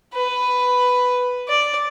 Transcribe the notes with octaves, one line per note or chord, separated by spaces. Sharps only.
B4
D5